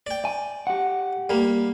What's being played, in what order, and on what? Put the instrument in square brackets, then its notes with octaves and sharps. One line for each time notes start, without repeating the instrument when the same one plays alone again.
[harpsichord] D5 G5
[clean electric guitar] G#5
G4 F#5
[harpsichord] G3 A#3